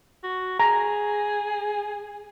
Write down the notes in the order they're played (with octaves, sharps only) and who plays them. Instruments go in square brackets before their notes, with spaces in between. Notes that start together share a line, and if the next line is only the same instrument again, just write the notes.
[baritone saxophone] F#4
[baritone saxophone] G#4 [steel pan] A#5